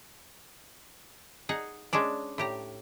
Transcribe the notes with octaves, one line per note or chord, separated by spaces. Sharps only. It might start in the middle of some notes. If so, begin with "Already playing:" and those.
D#4 G#4 F#5
G#3 C#4 D4 D5
A2 G4 A#5